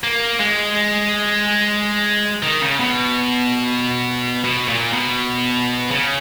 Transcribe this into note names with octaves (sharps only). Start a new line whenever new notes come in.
A#3
G#3
D#3
C#3
B2
B2
A#2
B2
C#3